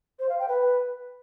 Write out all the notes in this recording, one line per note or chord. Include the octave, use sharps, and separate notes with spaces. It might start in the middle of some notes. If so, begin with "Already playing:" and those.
C5
F5
G5
B4